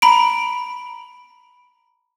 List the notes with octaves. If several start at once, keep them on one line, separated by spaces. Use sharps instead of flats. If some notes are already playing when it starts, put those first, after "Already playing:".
A#5 B5 D7